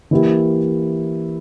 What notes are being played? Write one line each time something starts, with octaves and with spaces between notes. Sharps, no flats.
E3 A#3 E4 G4